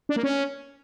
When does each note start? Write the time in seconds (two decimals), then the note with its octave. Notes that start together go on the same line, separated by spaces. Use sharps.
0.09 D4
0.16 A#3
0.23 C#4